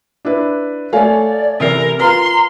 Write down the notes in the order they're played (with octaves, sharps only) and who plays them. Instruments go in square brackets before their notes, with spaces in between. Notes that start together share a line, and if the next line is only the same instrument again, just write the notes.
[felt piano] D4 E4 B4
[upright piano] A3 G#5 [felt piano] C#5 F5 [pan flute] D5
[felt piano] C3 E3 C7 [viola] A#4
[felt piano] F4 F6 [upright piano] B4 [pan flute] A#5 [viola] C6